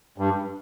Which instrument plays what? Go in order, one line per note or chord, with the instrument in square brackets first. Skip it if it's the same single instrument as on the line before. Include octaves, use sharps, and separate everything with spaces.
[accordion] G2